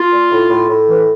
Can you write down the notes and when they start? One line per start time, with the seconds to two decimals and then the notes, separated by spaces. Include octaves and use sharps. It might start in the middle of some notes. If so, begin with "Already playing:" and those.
Already playing: F4
0.12 A#2
0.31 A2
0.50 A2
0.69 A2
0.87 E3